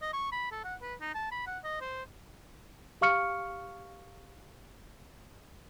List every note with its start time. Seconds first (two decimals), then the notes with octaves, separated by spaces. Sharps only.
0.02 D#5
0.13 C#6
0.32 B5
0.52 A4
0.64 F#5
0.82 B4
1.01 D#4
1.15 A5
1.31 B5
1.47 F#5
1.64 D#5
1.81 C5
3.01 G4 F5 C#6 F6 C#7